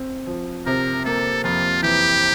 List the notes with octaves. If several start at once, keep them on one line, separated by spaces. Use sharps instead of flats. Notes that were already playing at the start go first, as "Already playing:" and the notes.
Already playing: C4
F3
C3 A#4
A#3 A4
F2 F4
E3 G4